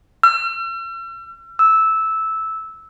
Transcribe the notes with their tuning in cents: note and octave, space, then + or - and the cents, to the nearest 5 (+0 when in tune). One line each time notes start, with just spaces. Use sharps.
E6 +45
E6 -10